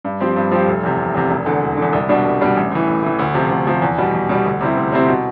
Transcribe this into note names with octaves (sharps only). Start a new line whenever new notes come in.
G2
F3 C4 G4
G2
F3 C4 G4
F1
E2 C3
F1
E2 C3
E1
E2 D3
E1
E2 D3
C2
B2 G3 D4
C2
B2 G3 D4
A1
A2 E3
A1
A2 E3
D2
C3 F3
D2
C3 F3
E2
B2 G3
E2
B2 G3
D2
C3 G3 C4 E4
D2
C3 G3 C4 E4
B2